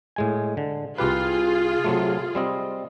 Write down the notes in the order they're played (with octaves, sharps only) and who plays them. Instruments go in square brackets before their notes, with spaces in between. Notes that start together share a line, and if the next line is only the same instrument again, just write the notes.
[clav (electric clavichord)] A2 G#3 G#5
D3
[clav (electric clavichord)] C2 G4 B4 [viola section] F4 G#4
[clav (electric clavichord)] C3 F#3 A3
G3 C4 D#5